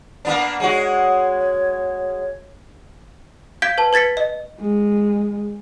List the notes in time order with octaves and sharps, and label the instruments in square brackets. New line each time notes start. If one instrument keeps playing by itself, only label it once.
[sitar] A#3 B3 D4
[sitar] G#3 F#4 [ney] C#5
[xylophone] F5 G6 G#6 B6 D7 G7
B4 A5
B4 G#6 A6 B6 C#7
D#5
[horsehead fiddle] G#3